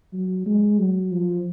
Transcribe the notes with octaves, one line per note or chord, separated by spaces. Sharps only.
F#3
G#3
F#3
F3